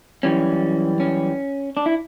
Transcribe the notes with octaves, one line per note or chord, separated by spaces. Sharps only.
F#2 E3 G3 C#4
C#4
D4
E4